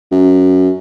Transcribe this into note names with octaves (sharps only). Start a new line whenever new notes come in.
F#2